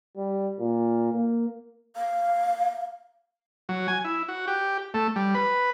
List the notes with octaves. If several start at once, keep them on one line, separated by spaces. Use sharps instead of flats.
G3
A#2
A#3
F5
F#3
G#5
E4
F#4
G4
A3
G3
B4